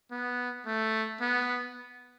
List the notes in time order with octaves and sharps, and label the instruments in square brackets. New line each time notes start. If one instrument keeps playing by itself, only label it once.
[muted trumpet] B3
A3
B3